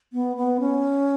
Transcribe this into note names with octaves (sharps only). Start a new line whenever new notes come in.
B3
B3
C#4